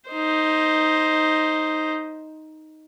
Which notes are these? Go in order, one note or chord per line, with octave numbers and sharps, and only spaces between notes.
D#4 C5